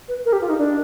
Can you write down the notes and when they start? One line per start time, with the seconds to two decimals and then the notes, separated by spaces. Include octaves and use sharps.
0.08 B4
0.25 A#4
0.33 G4
0.41 F4
0.49 D#4
0.58 D4